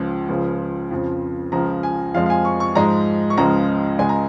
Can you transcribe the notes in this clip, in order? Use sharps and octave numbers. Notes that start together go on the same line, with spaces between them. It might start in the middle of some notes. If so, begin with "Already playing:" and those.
Already playing: C#2 C#3 F3
C#2 C#3 F3
F2 C#3 F3
C#2 C#3 F3 A#5
G#5
F2 F3 G#3 F5
F5
G#5
C#6
C#6
G#2 F3 G#3 A#5
C#6
C#2 C#3 F3 G#3 A#5
C#2 C#3 G#3 G#5
A#5